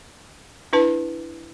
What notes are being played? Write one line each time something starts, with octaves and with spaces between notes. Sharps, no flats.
D4 E4 B4 A5